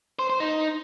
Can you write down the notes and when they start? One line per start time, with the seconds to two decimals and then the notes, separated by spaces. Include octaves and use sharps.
0.19 C5
0.30 C5
0.40 D#4